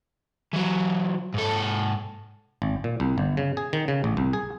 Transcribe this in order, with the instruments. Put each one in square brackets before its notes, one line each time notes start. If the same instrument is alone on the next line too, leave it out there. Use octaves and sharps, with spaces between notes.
[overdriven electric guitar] E3 F#3
G#2 A4
[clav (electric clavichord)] G#1
A#2
C2
G1
C#3
G#4
D#3
C#3
A1
C2
G#4